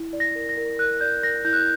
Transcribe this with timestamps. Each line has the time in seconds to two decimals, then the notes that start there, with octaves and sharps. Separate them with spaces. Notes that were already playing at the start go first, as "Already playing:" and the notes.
Already playing: E4
0.13 D5
0.20 A#6
0.35 A#4
0.49 A#6
0.57 A#4
0.79 A#4 F#6
1.01 D5 G6
1.23 A#4 A#6
1.45 E4 G6
1.53 F#6
1.60 G6